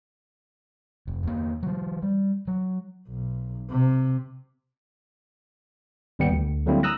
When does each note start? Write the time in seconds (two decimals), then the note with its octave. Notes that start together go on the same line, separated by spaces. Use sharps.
1.07 F1
1.23 E2 A#3
1.63 E3 F#3
2.02 G3
2.48 F#3
3.08 B1
3.70 C3
6.19 G#1 D#2 G3 B3 G5 C#7
6.32 D2
6.66 D3 F#3 G3 A#3 C4 E4
6.83 A#5 D#6 E6 F#6 A#6